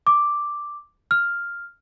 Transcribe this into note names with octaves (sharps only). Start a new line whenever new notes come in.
D6
F6